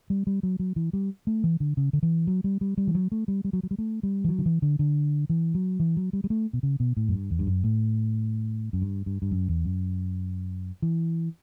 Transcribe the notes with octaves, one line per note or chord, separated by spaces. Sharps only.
G3
G3
F#3
F#3
E3
G3
A3
E3
D3
C#3
D3
E3
F#3
G3
G3
G3
E3
F#3
A3
G3
G3
F#3
F#3
G3
A3
G3
E3
F#3
D3
E3
D3
D3
E3
F#3
E3
F#3
G3
G3
A3
B2
C#3
B2
A2
F#2
G2
E2
G2
F#2
A2
F#2
G2
G2
G2
F#2
E2
F#2
E3